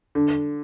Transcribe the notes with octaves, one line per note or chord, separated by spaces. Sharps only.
D3